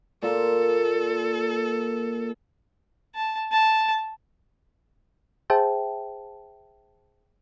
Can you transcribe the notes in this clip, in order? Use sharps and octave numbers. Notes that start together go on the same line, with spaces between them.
A#2 A#3 A4
A5
A5
G#4 C5 E5 G5 A5